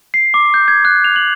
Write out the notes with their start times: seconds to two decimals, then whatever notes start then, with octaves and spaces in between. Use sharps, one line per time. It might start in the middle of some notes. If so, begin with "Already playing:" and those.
0.14 C7
0.34 D6
0.54 G6
0.68 G#6
0.85 F#6
1.04 F7
1.16 F#7